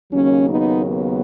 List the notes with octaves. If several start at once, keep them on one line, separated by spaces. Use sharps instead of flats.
D#2 C#3 F#3 A#3 C#4
B3 D#4
B3